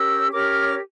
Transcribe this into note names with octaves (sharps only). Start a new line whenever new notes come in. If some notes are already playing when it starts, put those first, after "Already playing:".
Already playing: C#4 G4 A#4 C#5 E6 G6
C#4 G4 A#4 C#5 D6 F6